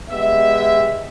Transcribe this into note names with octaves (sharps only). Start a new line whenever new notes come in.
G#3 B3 G4 E5